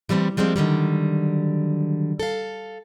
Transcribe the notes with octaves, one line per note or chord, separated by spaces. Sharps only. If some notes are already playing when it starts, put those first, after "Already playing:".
E3 G3 A3 C4
F3 G3 G#3 A#3 C4
D3 D#3 F#3 G3
A4 F5